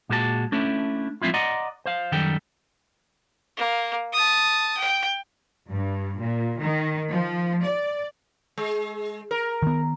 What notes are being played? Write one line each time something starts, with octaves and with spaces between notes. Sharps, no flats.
A#2 G#3 F#4 A#4 A5
A3 C#4 D4 E4
F3 G#3 C4 E4 F4
D5 D#5 F#5 A#5 C6
C5 F5
F#2 D#3 G3 A4 G5
A#3
A5 D#6
G5
G2
A#2
D#3
F3
D5
G#3
A#4
D#3 B3